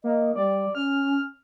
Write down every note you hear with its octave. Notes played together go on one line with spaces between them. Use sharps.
A#3 D#5
G3 D5
C#4 F6